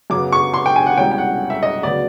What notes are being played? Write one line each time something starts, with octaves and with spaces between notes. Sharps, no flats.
F#2 C#3 F#3 B3 D6
C#6
C6
G5
G#5
F#5
C2 B2 G#3 C#4 G5
G5
F#5
E5
D#5
D2 C#3 F#3 B3 D5